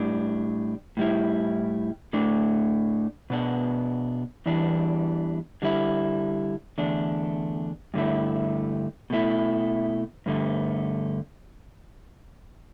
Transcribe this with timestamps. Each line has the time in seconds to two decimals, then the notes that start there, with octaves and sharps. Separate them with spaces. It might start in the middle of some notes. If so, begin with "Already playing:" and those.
Already playing: A2 G3 D4
0.97 A2 G3 E4
2.13 A2 A3 D4
3.30 B2 B3 D4
4.46 E2 E3 G3 D4
5.62 D3 G3 E4
6.78 E2 D3 A3 D4
7.94 G2 D3 A3 E4
9.10 B2 A3 E4
10.26 G2 D3 A3